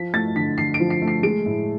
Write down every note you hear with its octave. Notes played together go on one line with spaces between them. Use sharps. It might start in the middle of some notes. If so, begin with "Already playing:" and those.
Already playing: F3 B6
A3 A6
D3 B6
D3 C7
D7
F3
C7
A3
C7
G#3 D7
A2